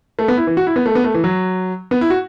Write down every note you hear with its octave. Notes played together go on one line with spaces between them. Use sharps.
A3
B3
E4
E3
F#4
E4
B3
A3
B3
A3
E3
F#3
B3
E4
F#4